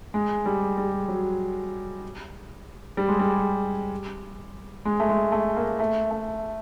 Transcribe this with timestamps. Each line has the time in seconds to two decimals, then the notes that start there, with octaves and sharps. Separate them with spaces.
0.14 G#3
0.46 G3
0.77 G3
1.08 F#3
2.97 G3
3.08 G#3
3.19 G3
4.85 G#3
5.00 A3
5.09 G#3
5.32 A3
5.56 A#3
5.79 A3
6.11 A3